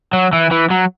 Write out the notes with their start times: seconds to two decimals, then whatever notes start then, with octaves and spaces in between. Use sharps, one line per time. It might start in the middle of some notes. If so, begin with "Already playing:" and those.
0.13 F#3
0.33 E3
0.51 E3
0.70 F#3